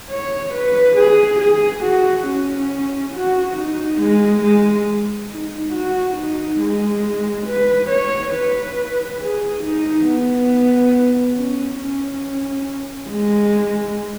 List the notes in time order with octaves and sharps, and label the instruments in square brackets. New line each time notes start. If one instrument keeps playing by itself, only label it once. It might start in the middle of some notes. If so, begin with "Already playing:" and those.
[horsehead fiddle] C#5
B4
G#4
G#4
F#4
C#4
F#4
D#4
G#3
G#3
D#4
F#4
D#4
G#3
B4
C#5
B4
G#4
D#4
B3
C#4
C#4
G#3